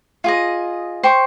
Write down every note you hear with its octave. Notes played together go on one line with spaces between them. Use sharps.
F4 G#4 D#5
C5 G5 C#6